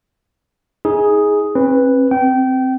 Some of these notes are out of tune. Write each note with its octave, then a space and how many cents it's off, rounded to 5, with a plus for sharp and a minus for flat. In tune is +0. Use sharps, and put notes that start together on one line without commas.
D#4 +30 G#4 +0
C4 +45 B4 +0
C4 +0 G5 -25